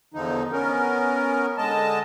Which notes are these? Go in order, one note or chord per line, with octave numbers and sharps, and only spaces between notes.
E2 D3 F3 D#4
B3 C#4 A#4
D3 G#3 D#5 A5